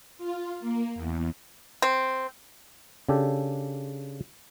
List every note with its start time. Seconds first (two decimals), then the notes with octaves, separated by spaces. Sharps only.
0.18 F4
0.60 A#3
0.95 E2
1.82 C4
3.09 C#3 D4 G4 A4